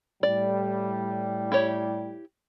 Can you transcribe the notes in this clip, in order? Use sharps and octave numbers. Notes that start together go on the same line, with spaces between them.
A2 G3 D5
E4 G4 C#5